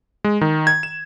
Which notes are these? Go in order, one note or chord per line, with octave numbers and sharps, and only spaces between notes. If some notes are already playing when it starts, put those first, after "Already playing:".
G#3
D#3
G#6
E7